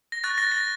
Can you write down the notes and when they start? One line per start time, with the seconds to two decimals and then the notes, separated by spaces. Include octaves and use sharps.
0.12 A#6
0.24 C#6 F#6 A6
0.38 A#6
0.52 A#6